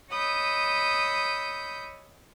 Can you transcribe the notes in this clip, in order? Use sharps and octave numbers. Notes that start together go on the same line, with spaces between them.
C#5 D#5 B5 D#6 E6 G6